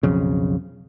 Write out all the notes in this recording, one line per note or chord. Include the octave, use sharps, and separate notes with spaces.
B1 F2 C#3